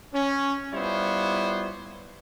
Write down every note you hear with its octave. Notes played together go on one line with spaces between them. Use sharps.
C#4
G3 B3 E4 F4 C5 C#5